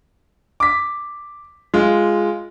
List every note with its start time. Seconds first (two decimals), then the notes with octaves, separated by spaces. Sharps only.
0.60 D6 B6
1.74 G#3 F4